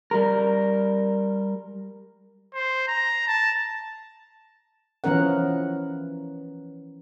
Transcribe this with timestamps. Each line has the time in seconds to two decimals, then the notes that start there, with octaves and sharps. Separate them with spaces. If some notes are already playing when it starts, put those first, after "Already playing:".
0.11 G3 A#4
2.55 C5
2.87 A#5
3.28 A5
5.04 E3 F3 B3 C#4 A#4 F#5